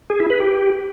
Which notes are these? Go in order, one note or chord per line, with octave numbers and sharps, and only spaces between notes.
G#4
E4
B4
G4